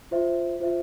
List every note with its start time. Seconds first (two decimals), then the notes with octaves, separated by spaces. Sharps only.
0.11 F4 C5 E5
0.60 F4 C5 E5